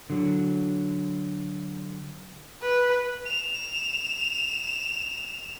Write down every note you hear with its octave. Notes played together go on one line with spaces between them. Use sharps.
D3 F#3
B4
E7 F7